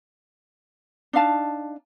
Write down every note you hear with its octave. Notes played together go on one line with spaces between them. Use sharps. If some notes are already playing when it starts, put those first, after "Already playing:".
D4 D#4 F5 A5